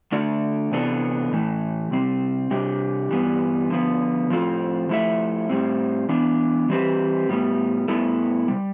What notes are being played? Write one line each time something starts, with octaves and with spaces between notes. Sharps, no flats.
D3 A3 D4 A4 D5
C3 E3 B3 D4 A4
A2 E3 A3
C3 G3 C4
C3 G3 D4 G4
G2 E3 G3 B3
D3 F3 B3
A2 F3 C4 F4 A4
F3 A3 E4 A4 E5
A2 G3 C4
E3 B3 D4
E3 G3 C4 G4 B4
A2 G3 B3
A2 G3 B3 E4 A4
C3 G3